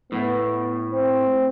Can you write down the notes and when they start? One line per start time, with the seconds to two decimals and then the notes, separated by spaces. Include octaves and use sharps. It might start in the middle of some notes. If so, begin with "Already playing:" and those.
0.11 A2 B3
0.92 C4